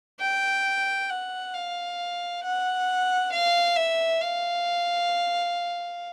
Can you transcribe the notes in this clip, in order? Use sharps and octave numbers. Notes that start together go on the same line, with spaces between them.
G5
F#5
F5
F#5
F5
E5
F5